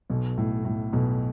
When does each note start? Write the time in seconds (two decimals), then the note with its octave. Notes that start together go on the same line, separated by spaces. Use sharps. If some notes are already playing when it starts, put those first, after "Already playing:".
0.10 B1 B2
0.38 A2
0.65 A2
0.93 B1 B2